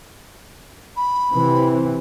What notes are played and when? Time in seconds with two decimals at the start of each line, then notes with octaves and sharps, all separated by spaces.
0.97 B5
1.31 C3 E3 C4